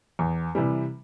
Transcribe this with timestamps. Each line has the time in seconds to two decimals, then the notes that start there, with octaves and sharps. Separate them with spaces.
0.19 E2
0.55 C3 E3 G3